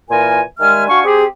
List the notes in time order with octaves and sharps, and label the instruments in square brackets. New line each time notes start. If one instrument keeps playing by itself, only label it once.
[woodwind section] A#2 E3 F4 A#4 G#5
D#3 G3 G#3 E5 G#5 F6
D4 F#4 F5 G#5 C#6
C4 G4 G#4